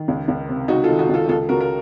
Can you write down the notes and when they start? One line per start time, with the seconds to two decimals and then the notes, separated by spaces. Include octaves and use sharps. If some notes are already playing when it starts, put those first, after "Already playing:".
Already playing: D#3
0.08 C#2
0.28 C#2
0.49 C3
0.68 C#2 D#4 F#4
0.84 F4 A4
0.89 D#3
0.99 D#4 F#4
1.09 C#2
1.14 F4 A4
1.29 C#2 F4 A4
1.49 C#3 F#4 A#4
1.61 A#4